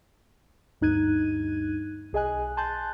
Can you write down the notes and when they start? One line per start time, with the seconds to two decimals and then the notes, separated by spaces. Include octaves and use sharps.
0.81 D2 G2 D#4 F#6 G#6 D#7
2.13 B1 G#4 D#5 G#5 F#6
2.57 G#5 A5 C6 F#6 G6 A6